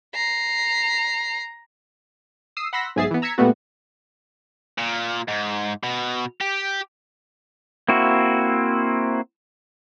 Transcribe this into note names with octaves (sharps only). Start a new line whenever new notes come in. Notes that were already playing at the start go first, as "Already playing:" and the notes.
A#5 C7
D#6 E6 C7
F#5 B5 C6 E6 A#6 B6
B1 G#2 G#4 E5 A6 C7
E3 B3
A#5 E6 G#6 B6 C#7
A#2 G3 A3 B3 F#4
A#2
G#2
B2
G4
A#3 C4 E4 F#4